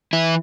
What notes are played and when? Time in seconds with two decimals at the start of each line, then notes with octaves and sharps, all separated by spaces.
0.13 E3 E4